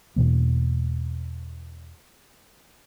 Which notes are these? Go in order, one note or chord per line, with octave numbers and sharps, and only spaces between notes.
E2 B2 E3 A#3